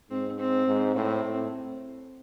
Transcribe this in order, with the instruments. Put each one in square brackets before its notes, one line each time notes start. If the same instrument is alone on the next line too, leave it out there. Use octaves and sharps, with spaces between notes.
[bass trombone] G#2 [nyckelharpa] C4
[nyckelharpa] C4
[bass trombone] G#2
[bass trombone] A2 [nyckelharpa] C4
[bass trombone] A2